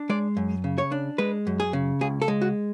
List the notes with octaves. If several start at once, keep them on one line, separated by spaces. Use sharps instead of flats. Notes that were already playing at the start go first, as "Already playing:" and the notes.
Already playing: D4
G#3 D5
F#2
C#3
C#5
D4
G#3 B4
F#2
G#4
C#3
C#2 G#4
A4
G#3
F#4